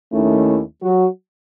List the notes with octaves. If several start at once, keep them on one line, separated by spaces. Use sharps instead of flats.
D#2 D#3 A3 C#4 E4
F#3 F#4